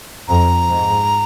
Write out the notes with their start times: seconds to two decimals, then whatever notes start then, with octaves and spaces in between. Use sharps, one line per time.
0.28 F2 A#5
0.69 G#2